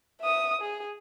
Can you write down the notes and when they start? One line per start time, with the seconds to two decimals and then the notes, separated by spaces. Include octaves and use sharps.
0.21 E5 D#6
0.61 G#4